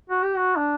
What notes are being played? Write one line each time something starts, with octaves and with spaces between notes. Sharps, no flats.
F#4
G4
F#4
D4